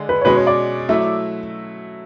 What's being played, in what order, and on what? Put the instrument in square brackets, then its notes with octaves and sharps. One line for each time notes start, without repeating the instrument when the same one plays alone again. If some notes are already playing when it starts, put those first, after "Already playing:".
Already playing: [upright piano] D3 G#3 D4
[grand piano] B4
C#5
[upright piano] B2 G#3 C#4 [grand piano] B4
[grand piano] C#5
D5
[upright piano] F#3 A3 E4